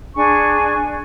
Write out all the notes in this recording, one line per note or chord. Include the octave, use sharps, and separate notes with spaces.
D4 G#4 G#5 C#6